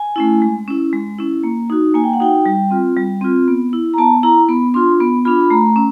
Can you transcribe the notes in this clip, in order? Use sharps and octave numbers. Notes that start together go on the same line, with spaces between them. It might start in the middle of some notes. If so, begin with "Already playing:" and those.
Already playing: G#5
A3 C#4 E4
G#3
C#4 E4
G#3
C#4 E4
A#3
D#4 F#4
A#3 G#5
G5
F#5
D#4 F#4 G5
G3
C4 F4
G3
C4 F4
B3
E4
A#5
B3 A5
E4 A#5
B3 B5
D4 F4 C6
B3 B5
D4 F4 B5
B5
A3 A#5
C#4